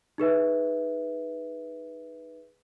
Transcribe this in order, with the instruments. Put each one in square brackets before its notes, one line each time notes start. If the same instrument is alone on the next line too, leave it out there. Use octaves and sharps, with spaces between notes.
[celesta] D#4 G#4 B4 E5